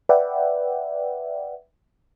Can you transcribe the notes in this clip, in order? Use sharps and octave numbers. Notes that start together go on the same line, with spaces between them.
B4 D5 E5 F#5 G5